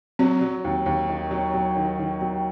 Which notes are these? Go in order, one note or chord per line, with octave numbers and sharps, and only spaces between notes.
F#3 C4
F#3
D#2
D#2
D#3
F#3
F#3
D#3
D#3
F#3